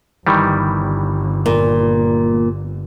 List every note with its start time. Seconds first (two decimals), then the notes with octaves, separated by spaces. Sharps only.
0.27 G1 D#3 E3 G3
1.46 A#2